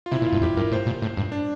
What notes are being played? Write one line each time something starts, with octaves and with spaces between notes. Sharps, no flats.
F4
C3 E4
A#2
F4
G2
F2 G4
G2 A#4
A2 C5
A#2
A2
G2
D4